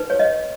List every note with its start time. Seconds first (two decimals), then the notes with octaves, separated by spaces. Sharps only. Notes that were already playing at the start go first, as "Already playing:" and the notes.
Already playing: D#4 B4
0.10 C#5
0.20 D#5